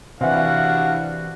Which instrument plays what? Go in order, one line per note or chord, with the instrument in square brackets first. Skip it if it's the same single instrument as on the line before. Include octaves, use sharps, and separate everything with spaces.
[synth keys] C3 E3 [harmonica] D4 E4 F#5 [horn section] F#4 F5